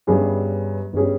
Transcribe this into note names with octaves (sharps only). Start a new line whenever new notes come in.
G1 G2 G3 C#4 G#4
G1 G3 C#4 G#4